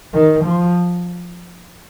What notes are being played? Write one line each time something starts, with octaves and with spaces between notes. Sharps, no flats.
D#3
F3